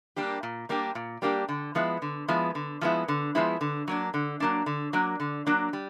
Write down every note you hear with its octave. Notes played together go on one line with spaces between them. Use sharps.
G3 A#3 D4 G4
A#2
G3 A#3 D4 G4
A#2
G3 A#3 D4 G4
D3
F3 G#3 B3 E4
D3
F3 G#3 B3 E4
D3
F3 G#3 B3 E4
D3
F3 G#3 B3 E4
D3
F#3 A#3 D4
D3
F#3 A#3 D4
D3
F#3 A#3 D4
D3
F#3 A#3 D4
G3